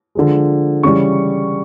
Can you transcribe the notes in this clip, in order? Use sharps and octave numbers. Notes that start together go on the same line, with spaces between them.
D3 F3 G#3
C#3 E3 G3 C#6